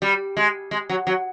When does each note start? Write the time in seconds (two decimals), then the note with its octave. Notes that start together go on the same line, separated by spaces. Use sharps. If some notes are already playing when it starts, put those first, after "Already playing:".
0.02 G3
0.37 G#3
0.71 G#3
0.89 F#3
1.07 F#3